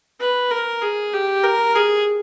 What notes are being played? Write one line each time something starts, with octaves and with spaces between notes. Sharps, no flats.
B4
A#4
G#4
G4
A#4
G#4